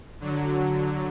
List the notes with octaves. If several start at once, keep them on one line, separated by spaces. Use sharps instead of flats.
D3 F#3